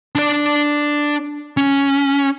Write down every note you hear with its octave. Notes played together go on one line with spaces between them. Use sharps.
D4 D5
C#4